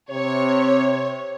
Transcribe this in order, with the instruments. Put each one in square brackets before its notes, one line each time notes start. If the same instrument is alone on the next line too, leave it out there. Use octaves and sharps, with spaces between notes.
[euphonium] C3 [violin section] C#5